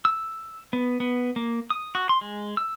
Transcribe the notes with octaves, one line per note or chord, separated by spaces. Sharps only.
E6
B3
B3
A#3
D#6
F#4
C6
G#3
E6